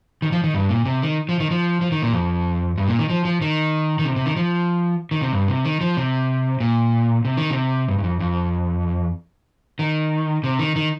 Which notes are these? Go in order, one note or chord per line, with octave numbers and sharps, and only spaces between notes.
D#3
F3
D#3
G2
A#2
C3
D#3
F3
D#3
F3
F3
D#3
A#2
F2
G2
A#2
D#3
F3
F3
D#3
D#3
C3
C3
D#3
F3
D#3
C3
G2
C3
D#3
F3
C3
A#2
C3
D#3
C3
G2
G2
F2
F2
D#3
C3
D#3
D#3